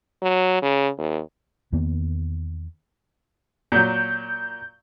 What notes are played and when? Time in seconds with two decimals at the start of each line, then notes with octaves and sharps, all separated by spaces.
0.22 F#3
0.62 C#3
0.98 D#2
1.72 E2 D#3 A#3 B3
3.72 A#2 F#3 G6